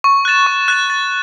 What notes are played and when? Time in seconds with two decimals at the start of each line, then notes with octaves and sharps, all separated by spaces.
0.04 C#6
0.25 F#6 A6 E7
0.47 C#6
0.68 F#6 A6 E7
0.90 A6